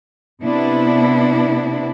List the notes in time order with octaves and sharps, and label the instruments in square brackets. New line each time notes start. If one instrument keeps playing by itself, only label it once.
[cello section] C3 B3 D4 E4